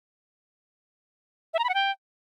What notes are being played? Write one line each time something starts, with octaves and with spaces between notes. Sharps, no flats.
E5
A#5
B5
F#5
G5